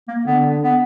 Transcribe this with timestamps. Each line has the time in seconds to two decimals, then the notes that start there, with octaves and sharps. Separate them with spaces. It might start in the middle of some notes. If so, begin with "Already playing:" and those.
0.08 A#3
0.26 D3 B3
0.63 B3